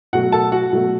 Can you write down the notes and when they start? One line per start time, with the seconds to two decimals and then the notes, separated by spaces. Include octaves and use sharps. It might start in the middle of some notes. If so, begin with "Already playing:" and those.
0.13 B2 F#3 A3 F#4 F#5
0.32 A4 A5
0.52 F#4 F#5
0.72 B2 F#3 A3